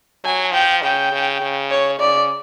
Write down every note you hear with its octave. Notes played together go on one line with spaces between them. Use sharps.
F#3 G#5
F3 G5
C#3 G5
C#3
C#3
C#5
C#3 D5